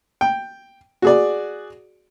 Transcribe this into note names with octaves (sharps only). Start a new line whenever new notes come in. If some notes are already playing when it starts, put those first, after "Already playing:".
G5
F#4 G#4 D5